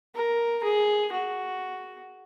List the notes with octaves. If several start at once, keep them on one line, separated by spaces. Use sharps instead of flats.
A#4
G#4
F#4